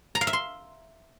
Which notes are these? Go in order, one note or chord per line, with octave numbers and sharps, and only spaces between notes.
A#5
F5
E5
C6